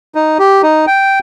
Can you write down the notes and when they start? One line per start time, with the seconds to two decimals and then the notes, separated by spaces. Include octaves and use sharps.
0.15 D#4
0.39 G4
0.63 D#4
0.87 G5